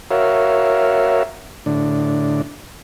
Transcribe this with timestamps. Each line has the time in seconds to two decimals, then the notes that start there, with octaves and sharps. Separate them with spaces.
0.11 F#4 A#4 C#5 E5 F5
1.66 A2 D3 D4